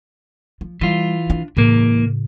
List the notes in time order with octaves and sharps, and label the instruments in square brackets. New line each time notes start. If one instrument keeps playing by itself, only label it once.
[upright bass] F3
[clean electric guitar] E3 F4 [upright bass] G3
[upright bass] D4
[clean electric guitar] C#2 E3 A#3 [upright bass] A2 C#3